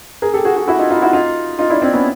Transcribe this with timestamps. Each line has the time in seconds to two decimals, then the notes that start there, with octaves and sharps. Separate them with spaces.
0.22 G#4 A#4
0.34 G4 A4
0.45 F#4 G#4
0.56 F#4 G#4
0.68 E4 F#4
0.79 D#4 F4
0.90 D#4 F4
1.02 E4 F#4
1.13 D#4 F4
1.59 D#4 F4
1.70 D4 E4
1.82 C4 D4
1.93 B3 C#4